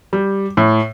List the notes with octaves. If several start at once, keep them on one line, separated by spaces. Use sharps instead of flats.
G3
A2